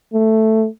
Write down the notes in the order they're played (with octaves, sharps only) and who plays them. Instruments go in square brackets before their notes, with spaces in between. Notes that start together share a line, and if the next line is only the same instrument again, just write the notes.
[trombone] A3